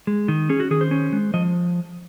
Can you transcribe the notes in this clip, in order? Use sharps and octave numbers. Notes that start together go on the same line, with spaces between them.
G#3
D#3
C#4 G#4
F#4
D#3 G#4
C5
C#4
G#3
F3 D#5